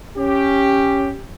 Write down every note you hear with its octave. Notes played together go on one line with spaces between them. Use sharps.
C#4 G4